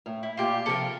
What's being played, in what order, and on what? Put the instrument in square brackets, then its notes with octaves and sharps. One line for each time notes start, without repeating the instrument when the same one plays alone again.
[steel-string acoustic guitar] A2
[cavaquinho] E4
[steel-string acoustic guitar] A#2 [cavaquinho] F4 G4
[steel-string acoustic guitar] C3 F3 [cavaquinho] A4 A#4